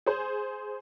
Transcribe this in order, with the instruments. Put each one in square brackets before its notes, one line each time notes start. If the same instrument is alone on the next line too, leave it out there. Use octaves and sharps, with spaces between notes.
[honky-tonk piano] G#4 C5